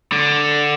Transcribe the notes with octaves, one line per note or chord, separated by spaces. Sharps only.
D3